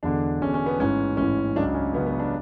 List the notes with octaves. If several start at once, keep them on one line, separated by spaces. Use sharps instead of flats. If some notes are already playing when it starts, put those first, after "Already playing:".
E1 E2 D3 D4
E1 E2 D3 C#4
C#4
B3
A1 G#2 E3 C#4
A1 G#2 E3 C#4
C#2 C#3 F#3 D4
C#4
C#2 C#3 F#3 B3
B3
D4